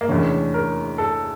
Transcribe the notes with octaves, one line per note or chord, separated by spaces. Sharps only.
A#3
F1 E2 D3 C#4
A#4
A4